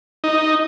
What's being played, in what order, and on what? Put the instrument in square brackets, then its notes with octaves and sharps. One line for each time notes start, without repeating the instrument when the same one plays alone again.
[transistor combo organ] D#4